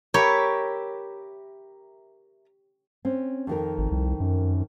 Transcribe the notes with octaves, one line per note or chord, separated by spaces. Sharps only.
G4 A#4 C#5 E5 B5
C4 C#4
F2 D#3 A#4
G#1
C2
F#2